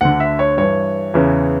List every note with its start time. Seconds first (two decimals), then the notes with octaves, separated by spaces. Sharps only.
0.01 D2 D3 F#5
0.20 E5
0.39 C#5
0.57 G2 E3 C#5
1.14 E2 C#3 E3